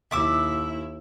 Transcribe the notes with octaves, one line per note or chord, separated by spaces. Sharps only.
D#2 E4 E5 D6 E6